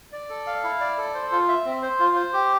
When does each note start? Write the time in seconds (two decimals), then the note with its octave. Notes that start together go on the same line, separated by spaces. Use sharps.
0.12 D5
0.29 A4
0.47 F5
0.64 E4
0.80 D5
0.98 A4
1.14 C5
1.31 F4
1.49 E5
1.65 C4
1.82 C5
1.99 F4
2.16 C5
2.33 G4